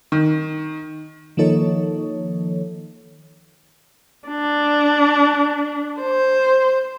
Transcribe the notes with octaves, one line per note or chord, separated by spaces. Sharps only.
D#3
D#3 F3 A#3 D#4 A4 C#5
D4
C5